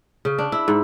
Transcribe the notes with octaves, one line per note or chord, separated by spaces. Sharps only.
C#3
D4
E4
G#2